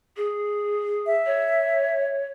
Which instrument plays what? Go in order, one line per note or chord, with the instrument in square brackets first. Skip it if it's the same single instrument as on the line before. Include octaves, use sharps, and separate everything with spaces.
[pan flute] G#4
[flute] E5
[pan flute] C#5